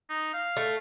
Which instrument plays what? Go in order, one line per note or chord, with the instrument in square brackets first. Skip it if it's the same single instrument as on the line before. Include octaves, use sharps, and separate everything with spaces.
[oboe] D#4
F5
[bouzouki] A3